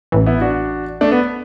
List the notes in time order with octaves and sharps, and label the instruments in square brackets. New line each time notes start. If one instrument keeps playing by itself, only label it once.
[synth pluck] A1 A2 E3
[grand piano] B3 E4
D4 F#4
A3 D4
B3